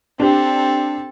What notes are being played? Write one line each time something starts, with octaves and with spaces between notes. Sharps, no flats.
C4 D4 G4 A4